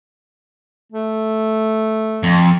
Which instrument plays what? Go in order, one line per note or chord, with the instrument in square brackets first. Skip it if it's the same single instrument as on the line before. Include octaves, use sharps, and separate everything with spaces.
[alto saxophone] A3
[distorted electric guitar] F2